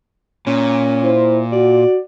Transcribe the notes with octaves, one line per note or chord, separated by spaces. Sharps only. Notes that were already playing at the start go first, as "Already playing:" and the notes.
A#2 C#4
E4 C5
F#4 D5